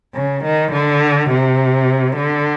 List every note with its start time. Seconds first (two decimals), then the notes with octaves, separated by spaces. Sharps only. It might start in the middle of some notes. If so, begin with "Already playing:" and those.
0.15 C#3
0.44 D#3
0.73 D3
1.30 C3
2.16 D3